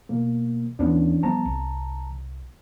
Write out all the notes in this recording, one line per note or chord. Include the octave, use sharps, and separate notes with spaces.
B2 A#3
D#2 E3 B3 C#4 D4
F3 G3 B3 A5 A#5
C2